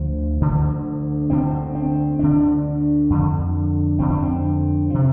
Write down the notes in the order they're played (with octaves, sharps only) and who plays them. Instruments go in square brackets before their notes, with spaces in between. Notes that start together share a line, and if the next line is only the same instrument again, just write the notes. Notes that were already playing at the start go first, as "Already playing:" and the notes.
Already playing: [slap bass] D2 D3 F3
D2 D3
D2 D3 C4
C4
D2 D3 D4
F2 D3
F2 D3 C4
D4
C4
C3 F3